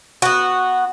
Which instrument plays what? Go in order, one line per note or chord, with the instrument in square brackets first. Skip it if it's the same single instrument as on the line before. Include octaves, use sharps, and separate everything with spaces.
[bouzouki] B3 F#4